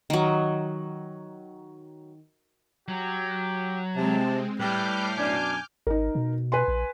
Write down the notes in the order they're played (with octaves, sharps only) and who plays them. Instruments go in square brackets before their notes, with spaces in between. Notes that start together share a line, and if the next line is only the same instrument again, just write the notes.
[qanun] D#3 F#3
[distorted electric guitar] F#3 [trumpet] G4
[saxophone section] C3 [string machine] G#3 C4 [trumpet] A5
[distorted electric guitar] A2 [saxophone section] G3 [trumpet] B4 [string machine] D6 F6 G6
[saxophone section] F#2 B2 D4 [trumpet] G#5
[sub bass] G#1 [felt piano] D#4 A#4
[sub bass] B2
[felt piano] B4 G#5 C6
[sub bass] A#1